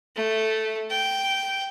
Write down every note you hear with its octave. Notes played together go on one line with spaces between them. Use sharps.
A3
G5